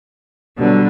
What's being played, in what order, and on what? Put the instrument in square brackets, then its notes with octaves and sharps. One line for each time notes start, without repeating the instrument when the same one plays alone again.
[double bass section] B2 G3 B3 [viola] D3 F#3